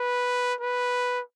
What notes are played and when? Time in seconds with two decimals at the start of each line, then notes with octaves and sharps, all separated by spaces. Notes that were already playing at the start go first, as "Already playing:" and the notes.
Already playing: B4
0.60 B4